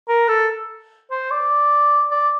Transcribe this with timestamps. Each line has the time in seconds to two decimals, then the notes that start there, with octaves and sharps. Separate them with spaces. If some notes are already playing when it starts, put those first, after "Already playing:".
0.09 A#4
0.28 A4
1.10 C5
1.31 D5
2.11 D5